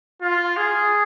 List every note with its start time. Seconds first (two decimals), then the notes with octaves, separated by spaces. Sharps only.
0.22 F4
0.57 G#4